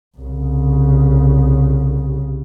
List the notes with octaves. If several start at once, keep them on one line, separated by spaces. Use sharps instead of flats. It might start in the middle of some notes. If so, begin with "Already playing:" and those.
C2 C#3